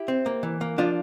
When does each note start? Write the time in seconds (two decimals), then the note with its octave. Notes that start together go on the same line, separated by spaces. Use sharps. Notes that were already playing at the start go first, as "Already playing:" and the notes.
Already playing: E4 G4
0.08 C4
0.26 A#3
0.43 E3
0.61 A#3
0.78 F3 D4 F4